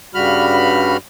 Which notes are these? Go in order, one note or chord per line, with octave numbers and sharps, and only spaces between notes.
G2 C#3 G3 F#4 B5 F6